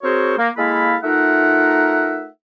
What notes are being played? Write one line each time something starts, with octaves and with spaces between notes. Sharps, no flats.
C4 F#4 G#4 A#4 C5 C#5
A#3
G#3 A#3 E4 A4 F5 B5
A3 D#4 F4 A#4 E5 F#5